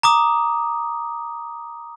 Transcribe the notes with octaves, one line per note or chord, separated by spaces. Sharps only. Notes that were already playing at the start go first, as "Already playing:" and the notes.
A#5 D6 D#6